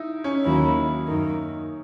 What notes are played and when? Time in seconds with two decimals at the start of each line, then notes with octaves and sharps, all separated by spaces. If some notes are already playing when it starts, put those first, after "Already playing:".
Already playing: D#4 E4
0.24 C#4
0.45 D#2 D#3 F#3 A#3 E4
1.07 F#2 D#3 A#3